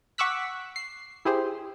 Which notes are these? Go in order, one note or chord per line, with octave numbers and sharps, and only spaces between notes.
F#5 C#6 D6 E6 F#6 B6
C7
E4 G4 G#4 C5